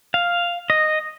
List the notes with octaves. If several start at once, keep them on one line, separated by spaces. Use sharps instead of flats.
F5
D#5